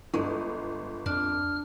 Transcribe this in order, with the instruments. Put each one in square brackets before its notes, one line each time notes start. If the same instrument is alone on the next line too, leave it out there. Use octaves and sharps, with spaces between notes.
[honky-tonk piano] G1 [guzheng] G#3
[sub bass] F2 [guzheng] D4 [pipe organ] F6